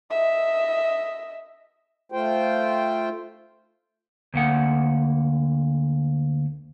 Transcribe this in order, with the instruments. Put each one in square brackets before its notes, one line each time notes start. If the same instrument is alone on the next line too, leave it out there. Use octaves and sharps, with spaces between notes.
[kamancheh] D#5 E5
[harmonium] A3 F4 C5 G5
[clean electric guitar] D2 A#3 F#5